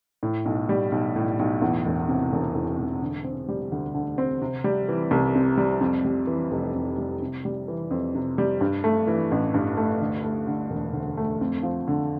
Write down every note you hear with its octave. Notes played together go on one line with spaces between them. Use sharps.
A2
B1
G3
B1
A2
B1
E2
E1
C3
E1
E2
E1
D3
C4
G3
D2
D3
C4
C3
G3
E3
C2
C3
G3
F2
G3
E3
F1
F2
G3
C3
G3
E3
F2
C3
G3
G2
A3
E3
A1
G2
A3
D2
A3
D3
E1
D2
A3
F2
F3
D3